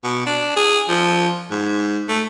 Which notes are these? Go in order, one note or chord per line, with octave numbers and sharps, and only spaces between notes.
B2
D4
G#4
F3
G#2
A3